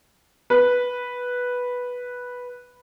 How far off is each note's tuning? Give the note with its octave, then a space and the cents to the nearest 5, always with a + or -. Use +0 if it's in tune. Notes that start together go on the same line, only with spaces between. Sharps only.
B4 -5